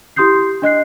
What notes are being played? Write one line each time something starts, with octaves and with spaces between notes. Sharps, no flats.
E4 G4 C6 D#6 G6 C7
D4 D#5 F#6 C7